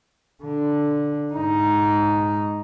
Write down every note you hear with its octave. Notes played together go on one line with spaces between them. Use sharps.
D3
G#2 D#4